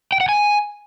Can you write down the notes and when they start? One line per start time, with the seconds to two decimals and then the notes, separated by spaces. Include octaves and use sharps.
0.12 G5
0.21 F#5
0.29 G#5